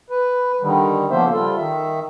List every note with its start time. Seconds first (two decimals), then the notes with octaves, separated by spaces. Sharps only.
0.10 B4
0.61 D3 D#3 G3
1.11 C#3 F3 A#3 B3 C5 E5
1.32 G3 F4 A4
1.57 D#3 E5